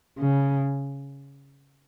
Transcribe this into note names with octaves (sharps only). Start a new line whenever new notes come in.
C#3